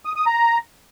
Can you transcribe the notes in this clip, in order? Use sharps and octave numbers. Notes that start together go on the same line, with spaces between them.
D#6
D#6
A#5